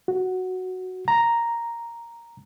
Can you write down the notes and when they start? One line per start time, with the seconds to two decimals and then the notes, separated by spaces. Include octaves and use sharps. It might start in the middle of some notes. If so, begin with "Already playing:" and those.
0.08 F#4
1.08 A#5